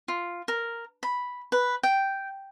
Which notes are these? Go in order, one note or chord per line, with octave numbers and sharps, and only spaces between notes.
F4
A#4
B5
B4
G5